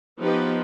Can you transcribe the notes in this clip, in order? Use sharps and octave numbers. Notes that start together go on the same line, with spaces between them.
F3 B3 D#4 G4 B4